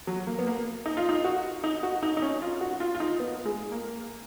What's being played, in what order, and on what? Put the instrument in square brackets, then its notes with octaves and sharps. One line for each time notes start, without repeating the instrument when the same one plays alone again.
[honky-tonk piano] F#3
A#3
B3
A#3
D#4
F4
D#4
F#4
D#4
F#4
D#4
D#4
C#4
F4
F#4
F4
F4
D#4
B3
G#3
A#3